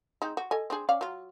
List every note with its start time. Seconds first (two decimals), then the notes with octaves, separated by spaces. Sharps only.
0.22 G#3 C4 D#4
0.37 F#4
0.51 A4 D#5 G#5
0.70 C4 D4 G#4
0.89 C#4 D5 F5
1.01 F#3 F4